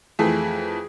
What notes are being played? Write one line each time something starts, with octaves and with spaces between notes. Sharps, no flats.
F2 E3 A3 G#4